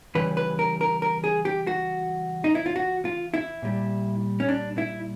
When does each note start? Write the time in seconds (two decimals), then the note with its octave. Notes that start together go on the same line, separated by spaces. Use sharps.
0.15 C#3 E3 G3 B4
0.37 B4
0.59 A#4
0.81 A#4
1.02 A#4
1.24 G#4
1.45 G4
1.67 F#4
2.44 D#4
2.55 E4
2.66 F4
2.76 F#4
3.05 F4
3.34 E4
3.62 A#2 G3
4.40 C#4
4.49 D4
4.78 E4